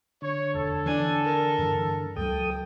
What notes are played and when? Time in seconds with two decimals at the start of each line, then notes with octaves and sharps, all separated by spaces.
0.22 D3 C#5
0.54 E1 A4
0.86 E3 D4 G#5
1.24 A#4
1.58 G2 E3
2.16 C#2 F#3 A4 G5 D#6